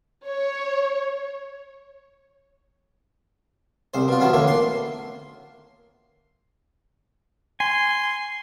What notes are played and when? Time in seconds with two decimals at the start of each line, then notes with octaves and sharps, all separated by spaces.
0.25 C#5
3.94 C2 C5
4.08 B2 F4
4.20 E2 F3 B3 C#4
4.33 A2 D3 A#3
4.48 C6
7.60 G#5 C6